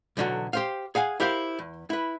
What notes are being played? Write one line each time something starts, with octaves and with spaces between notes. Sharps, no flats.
B1 E2 D3 F#3 F#4
G4 C5 F5
G#4 F5 F#5 G#5
E4 G4 A#4 C5 F5
E2
E4 B4